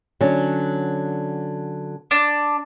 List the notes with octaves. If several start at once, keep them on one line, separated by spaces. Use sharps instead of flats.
D3 F#3 C#4
D4